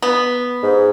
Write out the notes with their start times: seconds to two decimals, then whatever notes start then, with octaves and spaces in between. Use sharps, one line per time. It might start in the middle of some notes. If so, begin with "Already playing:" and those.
0.02 B3
0.63 G#2